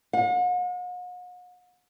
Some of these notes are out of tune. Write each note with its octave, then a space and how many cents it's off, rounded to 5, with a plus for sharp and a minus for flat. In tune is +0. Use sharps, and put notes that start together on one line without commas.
F#5 -45